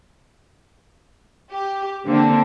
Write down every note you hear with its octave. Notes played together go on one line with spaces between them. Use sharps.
G4
D3 A#3 C4 D4